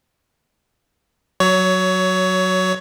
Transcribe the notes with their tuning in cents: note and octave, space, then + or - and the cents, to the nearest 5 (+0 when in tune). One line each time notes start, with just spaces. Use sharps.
F#3 +0 C#5 +20